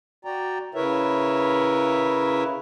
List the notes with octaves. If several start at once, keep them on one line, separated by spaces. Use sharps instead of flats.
F#4 D5 G5 A#5
C#3 E4 A#4 B4 C#5 E5